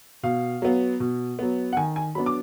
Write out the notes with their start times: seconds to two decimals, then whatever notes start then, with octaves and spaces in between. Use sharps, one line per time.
0.23 B2 F5
0.62 F#3 B3
1.00 B2
1.39 F#3 B3
1.73 F#5
1.77 D#3 G#5
1.96 G#5
2.15 F#3 B3 D4 B5
2.26 D6